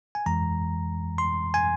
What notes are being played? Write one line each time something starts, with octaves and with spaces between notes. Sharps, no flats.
G#5
F2 E3 G#3 A#5
C6
G#5